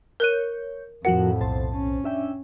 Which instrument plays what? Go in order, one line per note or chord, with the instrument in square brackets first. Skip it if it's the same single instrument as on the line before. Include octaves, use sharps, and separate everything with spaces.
[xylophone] A#4 F#6 D#7 [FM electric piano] C#5 G6
[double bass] F2 A2 [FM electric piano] F3 F#4 A#4 [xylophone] F#5
[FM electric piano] B1 C5 A5
[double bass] C#4
[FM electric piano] D4 E5 G5